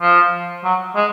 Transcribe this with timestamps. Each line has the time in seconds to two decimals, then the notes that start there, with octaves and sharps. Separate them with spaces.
0.02 F3
0.64 F#3
0.96 G#3